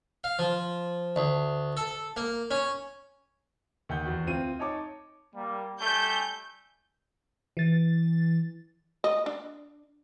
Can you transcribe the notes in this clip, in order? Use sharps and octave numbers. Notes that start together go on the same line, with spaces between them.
F5
F3
D2
A4
A#3
C#4
D#2 F#5 G6
E2 F#4
D2 C4 F4 D#7
D#4 C#5 A5 D6
G3 A#3
G3 A3 G#5 G6
E3 A6
D#5
D4